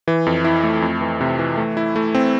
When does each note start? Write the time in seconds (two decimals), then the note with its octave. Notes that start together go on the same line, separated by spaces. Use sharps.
0.08 E3
0.26 F2
0.44 E4
0.64 A3
0.82 F2
1.01 E3
1.21 C3
1.39 E3
1.57 A3
1.77 E4
1.96 A3
2.15 C4